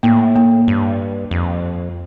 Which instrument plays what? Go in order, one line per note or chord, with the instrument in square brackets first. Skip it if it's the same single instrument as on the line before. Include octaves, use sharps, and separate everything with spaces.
[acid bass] A2 [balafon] A#3
[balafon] A#3
[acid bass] G2
F2